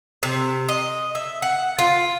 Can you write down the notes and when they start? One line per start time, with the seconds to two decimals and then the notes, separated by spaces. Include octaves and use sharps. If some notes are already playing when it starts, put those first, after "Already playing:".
0.23 C3
0.69 D#5
1.15 E5
1.42 F#5
1.79 F4